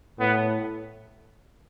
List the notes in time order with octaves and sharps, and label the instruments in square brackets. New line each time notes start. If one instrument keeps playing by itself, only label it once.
[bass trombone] A2 [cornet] B3